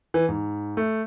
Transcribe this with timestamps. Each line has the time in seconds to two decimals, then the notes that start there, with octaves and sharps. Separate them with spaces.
0.14 E3
0.29 G#2
0.77 A3